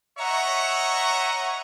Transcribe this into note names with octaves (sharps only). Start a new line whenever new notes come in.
C#5 D#5 E5 F#5 A#5 C#6